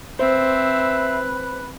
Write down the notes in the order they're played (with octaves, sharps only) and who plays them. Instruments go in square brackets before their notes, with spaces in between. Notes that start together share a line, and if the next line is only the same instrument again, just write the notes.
[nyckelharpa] C4 [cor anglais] B4 [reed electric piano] C5 [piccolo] E5